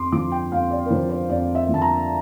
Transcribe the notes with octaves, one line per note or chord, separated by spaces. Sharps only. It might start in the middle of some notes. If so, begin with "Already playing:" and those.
Already playing: F2 C6 D6
D3 F3 D6
G5
F2 F5
D5
A#4
D3 F3 C5
C5
F2 D5
E5
D3 F3 A5
A#5